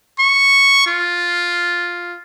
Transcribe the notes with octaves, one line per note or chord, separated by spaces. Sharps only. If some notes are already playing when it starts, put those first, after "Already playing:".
C#6
F4